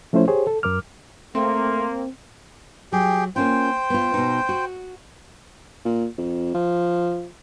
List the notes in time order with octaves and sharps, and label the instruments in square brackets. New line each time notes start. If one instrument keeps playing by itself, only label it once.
[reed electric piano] F3 A3 C#4 E4 C5
G4 G#4 C5 C#5
A4
F#2 A#4 D6 F6
[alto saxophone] A3 [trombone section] A#3 [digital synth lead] C4 [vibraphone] C6
[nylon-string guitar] F#3 [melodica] G4 G#4 G5
[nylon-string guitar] A#3 C#4 F4 [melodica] C5 G5
[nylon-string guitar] B3 F4
B2 D#4
F#4
[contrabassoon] A#2
F2
F3